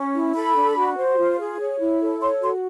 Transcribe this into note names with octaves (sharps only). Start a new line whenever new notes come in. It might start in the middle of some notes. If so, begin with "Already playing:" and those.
Already playing: C#4
E4
A4 B5
D4
F#4
C5
F4
G#4
C#5
E4
A4
C#5 C6
F#4 C6